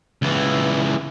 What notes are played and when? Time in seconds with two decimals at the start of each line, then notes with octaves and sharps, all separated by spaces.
0.22 C#2 E3